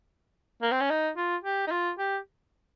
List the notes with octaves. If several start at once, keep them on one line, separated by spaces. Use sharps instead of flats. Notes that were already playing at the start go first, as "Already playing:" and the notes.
A#3
C4
C#4
D#4
F4
G4
D#4
F4
G4